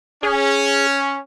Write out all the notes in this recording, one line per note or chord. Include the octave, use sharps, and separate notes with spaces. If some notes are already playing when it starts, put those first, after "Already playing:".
C#4 G#4